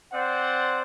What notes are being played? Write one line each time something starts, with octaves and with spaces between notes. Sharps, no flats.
C4 C5 D5 F#5